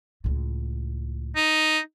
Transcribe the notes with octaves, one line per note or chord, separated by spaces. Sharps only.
C#2 A2
D#4